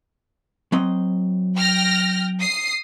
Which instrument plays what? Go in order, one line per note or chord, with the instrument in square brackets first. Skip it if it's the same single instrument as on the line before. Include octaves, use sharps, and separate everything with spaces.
[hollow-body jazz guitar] F#3 C4 D#5
[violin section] G5 F6 A#6
D#6 C7